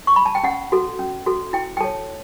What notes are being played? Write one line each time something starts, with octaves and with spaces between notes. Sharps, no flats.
C#6
B5
A5
G5
C#4 F#5
F#4 A4
C#4
F#4 A4
E4 G5
G5
A4 C#5 A5